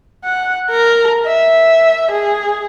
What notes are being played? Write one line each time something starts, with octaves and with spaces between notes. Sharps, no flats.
F#5
A#4
E5
G#4